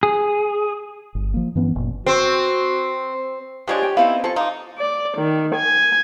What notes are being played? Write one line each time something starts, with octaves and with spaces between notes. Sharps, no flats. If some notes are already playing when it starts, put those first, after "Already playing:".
G#4
G1
F3 A#3
G2 E3 B3 C#4
F#1 A#2
C4 F#4
F3 G#3 D4 G4 C#5 G#5
G5
B3 C4 D#4 E4 F5
F3 A4 G#5 C#6
D#4 F4 D6
D5
D#3
G#5